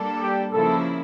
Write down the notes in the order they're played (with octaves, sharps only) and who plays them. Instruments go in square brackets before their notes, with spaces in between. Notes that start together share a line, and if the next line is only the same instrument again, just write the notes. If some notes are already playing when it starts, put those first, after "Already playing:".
Already playing: [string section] G3 A#3 D4 A4
[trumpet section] G4
[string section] C#3 F3 A#3 E4 [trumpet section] A4